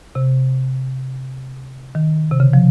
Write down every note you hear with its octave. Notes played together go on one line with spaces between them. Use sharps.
C3
D#3
C3
C#3
F3